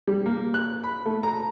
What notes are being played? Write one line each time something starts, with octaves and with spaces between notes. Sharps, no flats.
G3
A#3
F#6
B5
A3
A#5